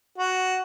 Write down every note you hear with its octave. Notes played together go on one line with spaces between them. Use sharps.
F#4